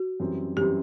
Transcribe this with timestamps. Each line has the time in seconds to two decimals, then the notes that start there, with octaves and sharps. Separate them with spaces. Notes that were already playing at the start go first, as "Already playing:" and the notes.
Already playing: F#4
0.20 F#2 E3 G3 C4
0.57 F#2 E3 G3 C4 G4